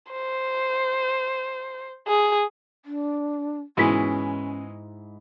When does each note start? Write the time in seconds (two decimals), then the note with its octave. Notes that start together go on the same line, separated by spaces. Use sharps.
0.11 C5
2.08 G#4
2.85 D4
3.77 G#2 B2 E3 G#3 C#4 E4 B6